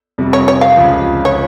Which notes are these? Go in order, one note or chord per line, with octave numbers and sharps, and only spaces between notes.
F2 C3 G3
C#5
C#5
F5
C#2 C#3 F3
C#5